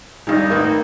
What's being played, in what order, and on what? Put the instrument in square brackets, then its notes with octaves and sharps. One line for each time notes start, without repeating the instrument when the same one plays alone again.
[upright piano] D#1 G2 D5 [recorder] D#4
[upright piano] A1 D#3 A#3